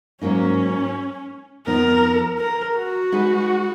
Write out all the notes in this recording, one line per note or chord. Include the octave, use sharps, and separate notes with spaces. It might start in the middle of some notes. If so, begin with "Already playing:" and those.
G#2 F#3 A#3 C#4 D#4
F2 F3 B3 D#4 A#4
A#4
F#4
G#3 D#4 G#4 B4